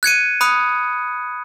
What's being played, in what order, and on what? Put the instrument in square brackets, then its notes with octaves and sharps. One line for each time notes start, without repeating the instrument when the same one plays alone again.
[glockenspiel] F#6 G#6 C#7 D#7
B5 D#6 F#6 C#7